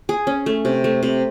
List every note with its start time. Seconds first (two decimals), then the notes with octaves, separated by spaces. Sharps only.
0.09 G#4
0.27 C#4
0.46 A3
0.65 C3
0.84 A3
1.03 C3